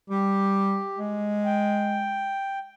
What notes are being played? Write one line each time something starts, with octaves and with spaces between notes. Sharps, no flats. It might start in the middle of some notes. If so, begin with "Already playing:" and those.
G3 G4
G#3
G5